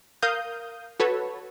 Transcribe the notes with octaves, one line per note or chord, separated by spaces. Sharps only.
A#4 F5 D#6 G6
F#4 A4 B4 C#5